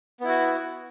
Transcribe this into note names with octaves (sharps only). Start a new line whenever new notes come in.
B3 E4 F#4